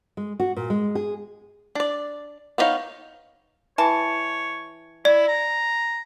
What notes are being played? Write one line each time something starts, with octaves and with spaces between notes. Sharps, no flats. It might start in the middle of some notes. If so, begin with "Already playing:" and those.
G#3
F#4
A#2
G#3
G#4
D4 D5
B3 D4 D#4 C#5 F5
E3 C#5 A5
E4 D5
A#5